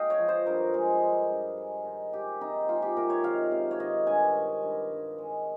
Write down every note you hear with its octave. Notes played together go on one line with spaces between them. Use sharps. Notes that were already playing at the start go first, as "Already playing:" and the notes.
Already playing: G#3 D#5 F5 G5
C#5
F3
C5
G2 A#4
G#3
G2
G2
G#3
D#3
G#3 G4
C3 D#4
G#3 F4
G4
C3 A#4
C#5
D#3 F5
C3
C#5
D#3 D#5
G2 G#5
G#3
G2
G2
G#3